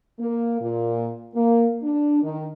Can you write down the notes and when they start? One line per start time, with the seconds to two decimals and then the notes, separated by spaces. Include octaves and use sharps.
0.20 A#3
0.61 A#2
1.35 A#3
1.83 D4
2.22 D#3